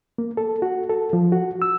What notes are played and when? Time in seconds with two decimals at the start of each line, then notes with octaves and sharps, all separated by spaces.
0.18 A#3
0.37 A4
0.62 F#4
0.89 A4
1.13 F3
1.32 F#4
1.62 E6